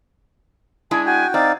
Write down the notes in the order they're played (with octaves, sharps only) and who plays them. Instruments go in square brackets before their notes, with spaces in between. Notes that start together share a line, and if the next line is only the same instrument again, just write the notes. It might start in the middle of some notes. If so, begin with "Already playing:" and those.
[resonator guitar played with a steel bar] G#3 D4 E4 [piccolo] G#5
[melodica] F#4 G5 [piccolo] G#5
[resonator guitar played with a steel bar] C4 [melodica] D#4 D5 F5 [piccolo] A6